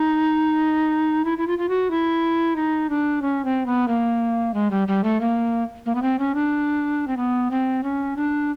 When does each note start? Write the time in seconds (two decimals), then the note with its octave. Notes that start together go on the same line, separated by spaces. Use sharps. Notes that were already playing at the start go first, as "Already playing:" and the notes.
Already playing: D#4
1.25 E4
1.38 E4
1.47 F4
1.58 F4
1.69 F#4
1.91 E4
2.56 D#4
2.90 D4
3.22 C#4
3.45 C4
3.66 B3
3.88 A#3
4.54 G#3
4.71 G3
4.88 G3
5.04 A3
5.21 A#3
5.86 A#3
5.95 B3
6.02 C4
6.19 C#4
6.35 D4
7.07 C4
7.17 B3
7.51 C4
7.83 C#4
8.17 D4